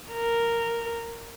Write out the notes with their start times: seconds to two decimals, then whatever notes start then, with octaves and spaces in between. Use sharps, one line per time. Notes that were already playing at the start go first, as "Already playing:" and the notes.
0.12 A#4